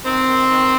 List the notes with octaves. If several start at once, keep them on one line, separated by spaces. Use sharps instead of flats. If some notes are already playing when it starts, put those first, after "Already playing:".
D#3 C4
D#3
D#3